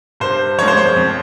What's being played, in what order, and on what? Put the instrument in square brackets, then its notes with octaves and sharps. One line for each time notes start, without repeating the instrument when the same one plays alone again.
[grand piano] G2 C5
F3 G#3 C#5
C5
C#5
F2